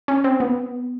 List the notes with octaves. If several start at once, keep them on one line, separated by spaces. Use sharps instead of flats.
C#4
C4
B3